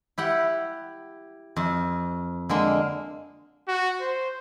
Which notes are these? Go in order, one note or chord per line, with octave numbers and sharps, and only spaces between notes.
E4 G4 F#5
F2
D3 G#3 A#3
F#4
C5